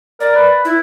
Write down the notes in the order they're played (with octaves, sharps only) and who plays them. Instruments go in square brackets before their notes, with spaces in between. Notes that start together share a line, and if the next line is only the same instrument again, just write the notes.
[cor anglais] A#4 [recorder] D5
[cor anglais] B4
[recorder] E4